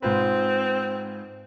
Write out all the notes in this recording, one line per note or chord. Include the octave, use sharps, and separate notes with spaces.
G#2 C4 F4 B4